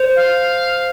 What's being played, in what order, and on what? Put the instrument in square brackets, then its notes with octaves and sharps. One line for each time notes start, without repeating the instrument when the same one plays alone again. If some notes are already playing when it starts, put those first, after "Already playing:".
Already playing: [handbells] C5
[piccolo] F5